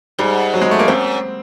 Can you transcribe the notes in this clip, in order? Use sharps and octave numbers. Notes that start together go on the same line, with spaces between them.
G#2 G3
F#3
G#3
A3
A#3
F#2 C4